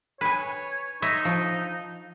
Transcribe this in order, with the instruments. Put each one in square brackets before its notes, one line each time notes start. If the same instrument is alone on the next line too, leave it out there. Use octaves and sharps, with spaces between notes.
[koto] B4 G#5 [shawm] C#5
[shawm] D#4 [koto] C#5 D#5 E5
[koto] F3